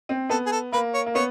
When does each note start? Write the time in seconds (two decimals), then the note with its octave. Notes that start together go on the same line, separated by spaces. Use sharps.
0.09 C4
0.30 B3 A4
0.46 G#4
0.52 A4
0.72 A#3 B4
0.94 C#5
1.06 A#3
1.15 B3 C#5